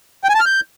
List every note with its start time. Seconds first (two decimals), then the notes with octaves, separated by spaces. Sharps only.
0.24 G5
0.29 G#5
0.35 A5
0.40 F6
0.46 G6